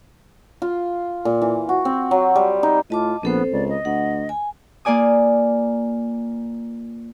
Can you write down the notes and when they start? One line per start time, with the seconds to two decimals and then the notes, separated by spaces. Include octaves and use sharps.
0.62 F4
1.25 A#2
1.42 E3
1.69 F#4
1.85 C4
2.11 F#3
2.36 G3
2.63 D#4
2.90 A2 F4 D#5 A5 D6
3.23 A#1 B3 C4 A4 C5
3.52 C#2 D5
3.69 D#5
3.85 D2 F#5
4.29 G#5
4.85 A#3 F4 D5 G#5 D#6